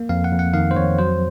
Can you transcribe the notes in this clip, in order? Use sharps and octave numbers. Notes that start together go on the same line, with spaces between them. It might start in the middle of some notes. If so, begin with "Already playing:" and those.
Already playing: A#3
F2 F5
F#5
F2
F#5
D#3 F5
C5
F2 C#5
F#3 C5